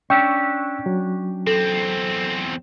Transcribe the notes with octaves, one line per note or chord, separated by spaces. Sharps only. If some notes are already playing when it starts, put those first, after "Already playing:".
C#4 D4 G5 C#6 E6 G6
F#3
E2 C4 A4